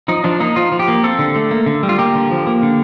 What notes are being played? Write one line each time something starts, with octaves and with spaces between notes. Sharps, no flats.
F3 D#4
F3 D4
A#3 D#4
F3 F4
F3
G4
A#3
C4 A4
D3
A3
A#3
D3
G3
F4
A#3 G4
D3
F3
A#3
D3